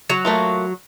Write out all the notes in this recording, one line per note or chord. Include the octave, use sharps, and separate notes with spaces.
F#3
A3 A#3 F4